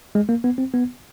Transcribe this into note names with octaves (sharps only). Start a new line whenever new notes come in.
G#3
A#3
B3
C4
B3